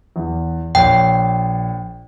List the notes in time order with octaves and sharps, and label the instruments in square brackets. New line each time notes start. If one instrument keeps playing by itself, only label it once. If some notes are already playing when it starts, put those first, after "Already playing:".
[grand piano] E2
[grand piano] A#1 C#5 [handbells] G5